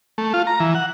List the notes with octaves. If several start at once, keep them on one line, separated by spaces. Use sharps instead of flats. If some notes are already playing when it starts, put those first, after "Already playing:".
A3
F4
A#5
E3
F#5